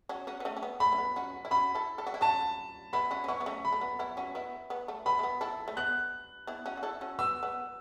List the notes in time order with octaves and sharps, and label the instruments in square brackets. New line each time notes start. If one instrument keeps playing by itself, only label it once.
[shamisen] C#4 F#4
C#4 F#4
B3
A3 C#4
C#4
B3
[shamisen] A3 [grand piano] B5
[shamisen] C#4
B3
C#4 F#4
E4
[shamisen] C#4 F#4 [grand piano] B5
[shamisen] E4 A4
A4
F#4
E4
[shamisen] C#4 F#4 [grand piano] A5
[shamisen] B3 E4 [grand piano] B5
[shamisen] C#4 F#4
C#4
[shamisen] B3 E4 [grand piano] C#6
[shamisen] B3
A3 C#4
[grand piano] B5
[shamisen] A3
B3
B3 E4
C#4 F#4
B3 E4
B3
A3
[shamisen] B3 [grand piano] B5
[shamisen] A3
B3
E4 A4
A3
[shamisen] B3 [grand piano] F#6
[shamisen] B3 E4
C#4 F#4
F#4
E4 A4
C#4 F#4
[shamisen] B3 [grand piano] E6
[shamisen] B3